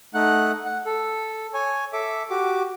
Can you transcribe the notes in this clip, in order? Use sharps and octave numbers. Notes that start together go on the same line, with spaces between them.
A3 D#4 F#5 F#6
F#5
A4
C#5 G#5
A4 E5 D6
F#4 G4 D6